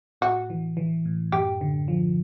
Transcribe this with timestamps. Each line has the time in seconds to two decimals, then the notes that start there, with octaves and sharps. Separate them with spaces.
0.21 A2 F#4
0.50 E3
0.77 E3
1.05 A2
1.32 F#2 G4
1.61 D3
1.88 F3